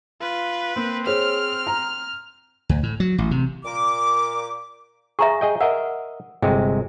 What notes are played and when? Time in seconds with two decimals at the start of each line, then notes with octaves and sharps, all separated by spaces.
0.21 F4 B4
0.76 A#3 C4
1.07 G#4 C5 C#5 F6
1.67 A#5
2.69 D2
2.83 A2
3.00 F#3
3.18 A1
3.31 C3
3.64 A#2 D6
5.19 G#4 E5 A#5 C#6
5.41 G#4 D#5 G5
5.61 A#4 D#5 E5 F#5
6.42 G1 C3 G#3 G5